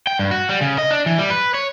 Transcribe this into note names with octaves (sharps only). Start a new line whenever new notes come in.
G5
G2
F#4
G3
C#3
D#5
D4
E3
G3
B4
C#5